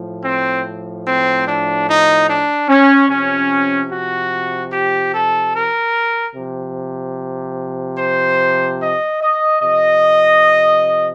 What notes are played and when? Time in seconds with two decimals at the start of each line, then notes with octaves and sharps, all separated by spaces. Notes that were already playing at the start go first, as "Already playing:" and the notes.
Already playing: A2 F3
0.24 C4
1.06 C4
1.47 D4
1.88 D#4
2.28 D4
2.68 C#4
3.09 C3 F3 C#4
3.91 F#4
4.72 G4
5.13 A4
5.54 A#4
6.35 C3 F3
7.98 C5
8.80 D#5
9.21 D#5
9.61 C3 F3 D#5